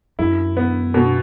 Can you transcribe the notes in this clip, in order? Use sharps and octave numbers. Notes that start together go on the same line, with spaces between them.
F#2 E4
B3
B2